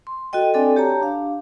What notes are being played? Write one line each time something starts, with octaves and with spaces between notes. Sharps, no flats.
C6
F#4 A4 D#5 G5
C4 D4 A4 D5 G5 G#5
G4 C#5 A5 A#5
D4 F5